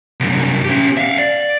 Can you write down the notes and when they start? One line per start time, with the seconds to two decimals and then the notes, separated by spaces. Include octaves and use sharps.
0.20 C2 F#2
0.65 C#4 G4
0.97 E5 F5
1.19 D5